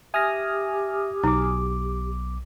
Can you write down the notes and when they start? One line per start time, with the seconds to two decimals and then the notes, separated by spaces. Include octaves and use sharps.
0.14 G4 E5 G#5 D#6 F6 A#6
1.24 B1 D#4 D6